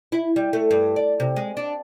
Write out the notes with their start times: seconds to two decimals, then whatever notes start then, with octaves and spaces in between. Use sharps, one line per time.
0.12 E4
0.36 G3
0.53 A3
0.71 G2
0.96 D5
1.20 C3
1.36 G#3
1.57 D4